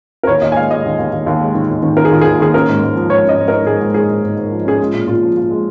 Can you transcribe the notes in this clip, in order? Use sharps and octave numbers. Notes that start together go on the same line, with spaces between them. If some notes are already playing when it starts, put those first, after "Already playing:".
A#4
D#2 C#5
D#2 D#5
G#5
G#3 F5
G#3 D#5
D#2
D#2
D#2
D#2
G#3
D#3
D#2
D#3
D#3 A#4
G#4
D#2 F4
D#2 G#4
D#2 G#4
C#4 A#4
G#2
G#2
F3
G#2 C#5
C#4 D#5
G#2
G#2 A#4
G#2 G#4
G#2
G#2 G#4
G#2
G#2
G#2
F3
C#4 G#4
G#3 F4
A#2
A#2 F4
F3
F3 F4
G#3